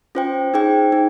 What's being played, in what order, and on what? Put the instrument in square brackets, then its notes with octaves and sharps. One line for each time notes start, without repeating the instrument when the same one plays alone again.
[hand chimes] C#4 F4 C5 G5
D#4 G#4 C5 G5
D#4 G#4